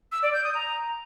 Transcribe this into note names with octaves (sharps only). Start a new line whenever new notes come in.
E6
D5
G6
D#6
A#5